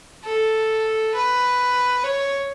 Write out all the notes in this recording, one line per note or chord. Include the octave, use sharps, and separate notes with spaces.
A4
B4
C#5